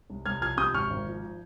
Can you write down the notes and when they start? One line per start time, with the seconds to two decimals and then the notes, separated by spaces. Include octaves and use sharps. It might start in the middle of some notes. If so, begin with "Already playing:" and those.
0.10 C2
0.26 C2 F6 G#6
0.41 F3 F6 G#6
0.57 C3 D#6 G6
0.73 G#1 C#6 F6
0.90 G#1
1.07 F3